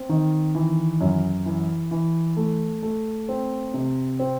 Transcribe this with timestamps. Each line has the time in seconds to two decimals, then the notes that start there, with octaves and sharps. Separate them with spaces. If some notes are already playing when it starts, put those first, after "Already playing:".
Already playing: C4
0.09 D#3
0.55 E3
1.01 F#2
1.46 E3
1.91 E3
2.37 A3
2.83 A3
3.29 C4
3.74 C3
4.19 C4